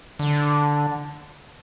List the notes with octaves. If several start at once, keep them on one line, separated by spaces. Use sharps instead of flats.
D3